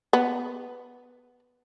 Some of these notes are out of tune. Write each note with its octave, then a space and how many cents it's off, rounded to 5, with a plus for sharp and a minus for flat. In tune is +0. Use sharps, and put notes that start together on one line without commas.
B3 +0 B4 +0